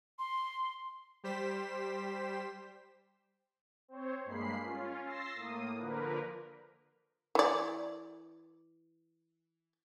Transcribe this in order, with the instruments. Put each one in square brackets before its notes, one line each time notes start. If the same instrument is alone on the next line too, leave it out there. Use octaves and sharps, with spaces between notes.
[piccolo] C6
[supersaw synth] G3 G4 C5 B6 E7
C4 C5 C#5
G2 G#3 A#3 B5 C7
C#4 F4
C6 E6 A6 A#6 C7
A2 A#3 D#6
D3 F3 A#3 A#4 B4
[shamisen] E3 D5